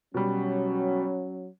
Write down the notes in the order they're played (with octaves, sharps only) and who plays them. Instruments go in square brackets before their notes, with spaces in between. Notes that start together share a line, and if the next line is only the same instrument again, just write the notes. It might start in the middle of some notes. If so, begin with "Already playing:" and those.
[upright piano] B2 G3 [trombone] F#3 [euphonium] C#4